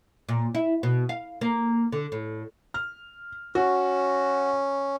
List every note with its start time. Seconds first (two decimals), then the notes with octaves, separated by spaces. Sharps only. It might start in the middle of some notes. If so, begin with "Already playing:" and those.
0.29 A#2
0.55 E4
0.83 B2
1.09 F5
1.41 A#3
1.92 D3
2.12 A2
2.74 F6
3.55 C#4 F#4